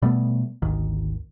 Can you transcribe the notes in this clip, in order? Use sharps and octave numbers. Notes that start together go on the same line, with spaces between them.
B2 G3 A3 B3
G#1 D2 D#3